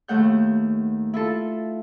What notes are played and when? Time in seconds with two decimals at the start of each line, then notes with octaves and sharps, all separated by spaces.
0.08 D#2 A3 F#5 G6
1.14 E4 F4 A4